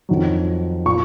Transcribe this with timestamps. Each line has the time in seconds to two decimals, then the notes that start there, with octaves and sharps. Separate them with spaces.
0.09 F2 D#3 F#3
0.86 A#2 C#6